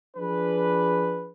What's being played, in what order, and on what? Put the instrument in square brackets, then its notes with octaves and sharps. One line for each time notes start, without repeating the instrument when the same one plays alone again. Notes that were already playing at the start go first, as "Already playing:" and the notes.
[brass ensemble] F3 D4 G#4 B4